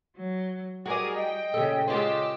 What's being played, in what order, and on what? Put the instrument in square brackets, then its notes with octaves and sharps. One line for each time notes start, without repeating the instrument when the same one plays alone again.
[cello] F#3
[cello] G3 [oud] F#4 D5 [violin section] G#4 A#4 D#6
[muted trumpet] D#5 [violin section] G5
[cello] A#2 C#3 [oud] G4 A4
[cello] C#3 [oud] G#3 F4 C5 [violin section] G4 E6 [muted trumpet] D#5